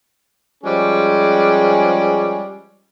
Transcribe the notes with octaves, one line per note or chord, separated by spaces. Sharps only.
F3 G3 G#3 C#4 G#4